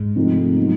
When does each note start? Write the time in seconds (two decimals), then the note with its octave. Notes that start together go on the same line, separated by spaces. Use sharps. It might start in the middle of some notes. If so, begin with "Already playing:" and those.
Already playing: G#2 G#3
0.16 C3 F3 A3 C4 D#4
0.57 F#3 B3 D#4